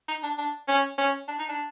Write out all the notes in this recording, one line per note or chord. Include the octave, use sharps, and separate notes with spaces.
D#4
D4
D4
C#4
C#4
D4
D#4
D4